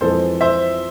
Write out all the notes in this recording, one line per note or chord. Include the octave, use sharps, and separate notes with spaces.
F2 E3 G#3 A4 C5
C5 E5